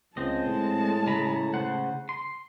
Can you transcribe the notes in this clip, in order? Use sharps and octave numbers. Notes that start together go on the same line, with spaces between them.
C#2 G#3 C4 D#5 A5
A2
C#3 A#5 B5
C#3 C5 F#5
C6